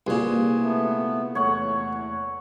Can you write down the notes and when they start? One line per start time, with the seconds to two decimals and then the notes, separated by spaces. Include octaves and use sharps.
0.07 C2 A#2 G#4 B4
0.60 A3 B3
1.35 E2 A3 C#5 F#5